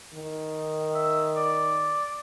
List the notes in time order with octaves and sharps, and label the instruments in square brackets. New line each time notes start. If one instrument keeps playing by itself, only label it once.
[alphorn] D#3
[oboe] E5
D5